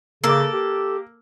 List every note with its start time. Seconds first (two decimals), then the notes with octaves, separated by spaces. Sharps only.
0.24 C#3 A#3 A4 D6
0.53 G4